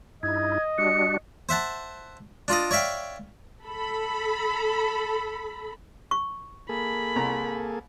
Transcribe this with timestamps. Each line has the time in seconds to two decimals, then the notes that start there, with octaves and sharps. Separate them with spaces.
0.23 G2 D#4 E4 D#5 G#6
0.78 G3 D4 F#4 C#7
1.49 C5 E5 F#5 A5
2.48 D4 F4 D5 D#5
2.71 C#5 D5 E5 F5 G5
3.63 A4 B5
6.11 C#6
6.69 A#3 G#4 A4 B5
7.16 C2 A#5